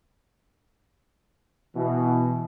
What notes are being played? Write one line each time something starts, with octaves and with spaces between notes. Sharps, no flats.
B2 E3